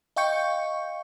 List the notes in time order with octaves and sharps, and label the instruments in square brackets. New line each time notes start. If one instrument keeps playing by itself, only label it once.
[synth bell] D#5 F5 G5 C#6 G6 C#7